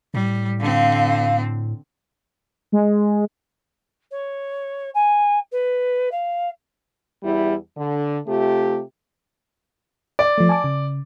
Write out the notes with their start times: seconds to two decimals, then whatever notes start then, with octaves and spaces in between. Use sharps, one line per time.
0.14 A2 G3
0.60 D3 C4 F5
2.72 G#3
4.11 C#5
4.94 G#5
5.51 B4
6.11 F5
7.23 E2 G3 E4
7.76 D3
8.27 C3 A3 F4 G4
10.19 D5
10.38 F3 A3
10.49 G#5 A5 D6
10.64 C#3